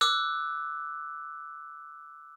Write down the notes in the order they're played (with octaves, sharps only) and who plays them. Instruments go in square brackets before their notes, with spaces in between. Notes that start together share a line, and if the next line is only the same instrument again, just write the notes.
[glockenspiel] D6 E6 F#6